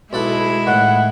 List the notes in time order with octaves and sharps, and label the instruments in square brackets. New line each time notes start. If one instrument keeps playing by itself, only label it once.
[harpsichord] B1 A4 F#5 [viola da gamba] G#3 E4
[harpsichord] A2 D#3 [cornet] F#5